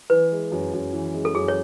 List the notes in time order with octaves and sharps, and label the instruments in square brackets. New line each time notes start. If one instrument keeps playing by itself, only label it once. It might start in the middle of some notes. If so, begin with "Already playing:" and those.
[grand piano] E3 [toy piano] B4
[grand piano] G#3
F#2
F#2
E3
G#3
[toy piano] A4
[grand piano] F#2 [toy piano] G#4
[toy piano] C#5